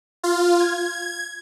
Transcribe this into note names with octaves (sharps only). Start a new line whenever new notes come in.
F4
G#6